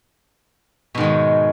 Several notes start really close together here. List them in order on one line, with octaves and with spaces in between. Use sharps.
B2 G#2 D#3 G#3